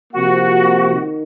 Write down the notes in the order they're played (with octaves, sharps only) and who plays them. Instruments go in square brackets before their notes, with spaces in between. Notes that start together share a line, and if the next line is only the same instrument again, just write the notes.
[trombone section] C3 F3 A#3 [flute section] F#4
[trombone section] D#3